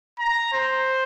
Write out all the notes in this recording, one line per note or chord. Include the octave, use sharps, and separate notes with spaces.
A#5
C5